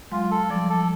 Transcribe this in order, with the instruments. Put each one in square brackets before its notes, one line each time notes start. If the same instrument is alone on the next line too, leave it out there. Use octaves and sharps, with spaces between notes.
[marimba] F#3 G#3 [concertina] F4
[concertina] A4
[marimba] F3 G3 [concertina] D5
[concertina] A4